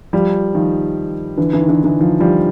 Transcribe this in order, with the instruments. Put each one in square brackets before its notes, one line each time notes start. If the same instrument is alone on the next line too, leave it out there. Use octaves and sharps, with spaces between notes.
[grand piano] F3 G3
D#3 F3
D3 E3
D3 E3
D#3
D3 E3
D3 E3
D#3 F3
F3 G3